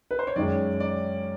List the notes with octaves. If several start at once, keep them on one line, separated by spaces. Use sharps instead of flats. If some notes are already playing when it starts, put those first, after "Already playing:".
B4
C5
C#5
F#2 D#3 G#3 C#4 D5
D5